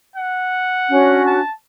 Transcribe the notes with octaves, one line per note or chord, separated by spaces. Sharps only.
F#5
C#4 D4 F#4
A5